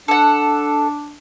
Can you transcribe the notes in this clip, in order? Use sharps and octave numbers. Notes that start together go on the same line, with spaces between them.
D4 A4 F#5